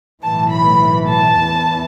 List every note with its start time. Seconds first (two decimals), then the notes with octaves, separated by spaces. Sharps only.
0.23 B1 A2 E3 A5
0.52 B5
1.09 A5
1.38 E2 E3